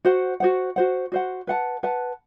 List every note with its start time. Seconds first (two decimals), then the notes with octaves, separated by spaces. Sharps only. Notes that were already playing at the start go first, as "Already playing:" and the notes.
0.05 F#4 C5 F#5
0.40 F#4 C5 F#5
0.76 F#4 C5 F#5
1.12 F#4 C5 F#5
1.47 B4 F#5 A5
1.83 B4 F#5 A5